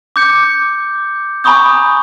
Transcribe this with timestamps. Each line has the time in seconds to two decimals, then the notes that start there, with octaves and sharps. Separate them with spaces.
0.16 D6 G6 C#7
1.44 G#5 A#5 B5 C#6 D#6 G6